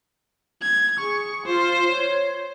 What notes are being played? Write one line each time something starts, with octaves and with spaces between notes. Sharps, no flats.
G#6
G#4 C#6
F4 C5
C#5